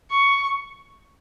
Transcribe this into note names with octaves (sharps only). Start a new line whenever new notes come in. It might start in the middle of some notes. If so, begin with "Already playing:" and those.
C#6